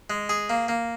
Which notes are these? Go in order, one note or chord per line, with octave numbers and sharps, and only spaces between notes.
G#3
G#4
A#3
A#3